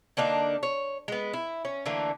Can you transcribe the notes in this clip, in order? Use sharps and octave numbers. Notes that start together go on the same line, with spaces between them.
D3 A#3 D4 D#4
C#5
G#3 B3
E4
C#4
D3 E3 A3 A#3